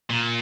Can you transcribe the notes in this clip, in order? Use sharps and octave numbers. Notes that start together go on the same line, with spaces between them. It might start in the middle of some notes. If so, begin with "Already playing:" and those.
A#2